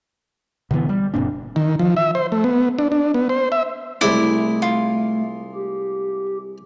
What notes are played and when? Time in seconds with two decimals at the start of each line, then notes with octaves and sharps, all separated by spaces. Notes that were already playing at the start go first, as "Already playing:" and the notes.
0.71 B2 D3 E3 B3
0.89 G3
1.14 F#1 A#2 C4 D4
1.56 D#3
1.79 F3
1.97 E5
2.15 C5
2.32 A3
2.44 B3
2.79 D4
2.92 D4
3.14 B3
3.29 C5
3.52 E5
4.01 C2 G#3 A3 E4 D5
4.62 F4
5.55 G4